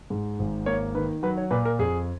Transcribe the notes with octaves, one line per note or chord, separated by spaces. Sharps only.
G#2
G#1
A#3 C#5
D#3 B4
F#3 B4
C#5
A#2 B4
A#4
F2 G#4